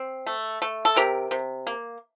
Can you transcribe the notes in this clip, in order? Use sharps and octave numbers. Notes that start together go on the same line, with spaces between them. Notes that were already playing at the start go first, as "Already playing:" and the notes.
Already playing: C4
A3
A3
A4
C3 G4 A#4
C3
A#3